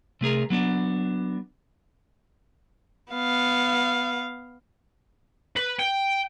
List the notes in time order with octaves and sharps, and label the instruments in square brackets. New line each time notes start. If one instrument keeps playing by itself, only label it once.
[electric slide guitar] C3 A3 G#4 A#4
F#3 B3 D4
[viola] B3 F5
[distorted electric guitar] B4
G5